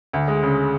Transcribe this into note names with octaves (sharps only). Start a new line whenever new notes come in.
D2
G#3
C#3